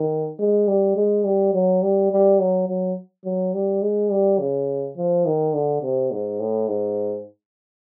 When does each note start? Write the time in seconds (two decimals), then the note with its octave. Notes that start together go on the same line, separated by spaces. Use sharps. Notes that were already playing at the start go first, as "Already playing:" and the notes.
Already playing: D#3
0.39 G#3
0.68 G3
0.97 G#3
1.24 G3
1.54 F#3
1.83 G3
2.11 G3
2.40 F#3
2.68 F#3
3.25 F#3
3.54 G3
3.82 G#3
4.11 G3
4.39 C#3
4.96 F3
5.26 D#3
5.54 D3
5.82 C3
6.11 G#2
6.40 A2
6.68 G#2